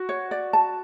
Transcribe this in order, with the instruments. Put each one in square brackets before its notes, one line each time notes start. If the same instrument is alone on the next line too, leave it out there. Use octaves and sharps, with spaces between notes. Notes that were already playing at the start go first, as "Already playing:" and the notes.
Already playing: [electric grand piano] F#4
[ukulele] C#5
D5
A5